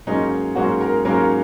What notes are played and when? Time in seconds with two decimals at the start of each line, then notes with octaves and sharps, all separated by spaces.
0.07 G#2 F#3 A#3 C#4 D#4
0.55 G#2 F#3 A#3 C#4 F#4
0.81 A#4
1.05 G#2 F#3 A#3 C#4 A#4